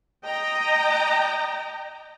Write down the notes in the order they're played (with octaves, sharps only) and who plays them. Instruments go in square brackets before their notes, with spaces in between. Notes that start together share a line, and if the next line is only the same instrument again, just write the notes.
[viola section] D#5 G5 A#5